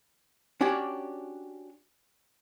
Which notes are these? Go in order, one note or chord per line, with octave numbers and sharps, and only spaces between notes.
C#4 D4 F#4 G4 C#5 D5